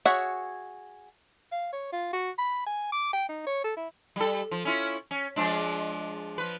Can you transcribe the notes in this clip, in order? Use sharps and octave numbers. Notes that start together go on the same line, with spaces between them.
F#4 G#4 C#5 E5 F#5
F5
C#5
F4
F#4
B5
G#5
D6
G5
D#4
C#5
A4
E4
G3 A4
F3
C#4 E4 F4
C#4
F3 G#3 D4
F3 B4